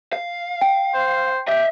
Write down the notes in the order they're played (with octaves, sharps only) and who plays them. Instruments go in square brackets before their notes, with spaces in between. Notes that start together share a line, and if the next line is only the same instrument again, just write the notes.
[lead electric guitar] F5
[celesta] G5
[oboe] C5
[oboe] G4 [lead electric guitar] D#5 E5